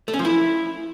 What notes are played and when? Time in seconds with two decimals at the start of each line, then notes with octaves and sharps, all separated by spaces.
0.08 A3
0.14 C#4
0.19 F3
0.25 E4